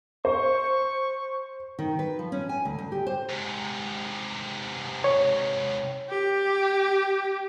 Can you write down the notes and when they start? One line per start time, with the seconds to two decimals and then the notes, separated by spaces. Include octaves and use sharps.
0.25 C5 C#6
1.79 D#3
1.99 B4
2.19 F3
2.32 C#4
2.49 G#5
2.65 D2
2.79 D2
2.92 G4
3.07 C5
3.29 G#2 C3
5.04 C#5
6.10 G4